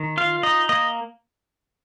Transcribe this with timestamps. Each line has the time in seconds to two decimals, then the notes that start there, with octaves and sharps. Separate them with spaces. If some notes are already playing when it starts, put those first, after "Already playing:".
Already playing: D#3
0.17 F4 F5
0.43 D#4 D#5
0.69 A#3 D#5